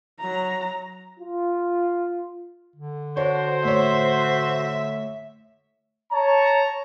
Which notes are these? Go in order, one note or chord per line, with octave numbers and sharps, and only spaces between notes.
F#3 A#5
F4
D3
D4 F#4 C5 C#5
A2 C#5 E5
C#5 A5 A#5